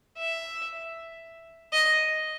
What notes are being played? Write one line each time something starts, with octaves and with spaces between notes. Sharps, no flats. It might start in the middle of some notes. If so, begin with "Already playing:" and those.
E5
D#5